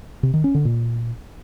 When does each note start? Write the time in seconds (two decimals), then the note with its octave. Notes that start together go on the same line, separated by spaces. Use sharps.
0.23 C3
0.34 D#3
0.44 C#4
0.55 D3
0.65 A#2